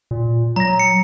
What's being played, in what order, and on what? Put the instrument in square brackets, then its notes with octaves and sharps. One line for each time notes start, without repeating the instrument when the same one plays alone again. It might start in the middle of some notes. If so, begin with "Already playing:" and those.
[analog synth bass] A#2
[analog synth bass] F#3 [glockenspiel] A#5 A#6
[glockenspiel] C#7